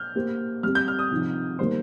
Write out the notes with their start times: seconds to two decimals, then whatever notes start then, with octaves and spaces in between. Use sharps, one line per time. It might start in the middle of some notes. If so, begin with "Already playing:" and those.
Already playing: F6 G6
0.15 A#3 G4 C5
0.63 G3 C4 G4 F6
0.75 G6
0.88 F6
0.99 D#6
1.11 C3 F3 D#4
1.59 D#3 G3 A#3 C5